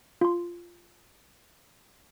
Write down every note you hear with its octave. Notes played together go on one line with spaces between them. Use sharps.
F4 C6